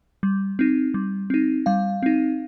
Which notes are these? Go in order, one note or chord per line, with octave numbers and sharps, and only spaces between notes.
G3
C4 D#4
G3
C4 D#4
G3 F5
C4 D#4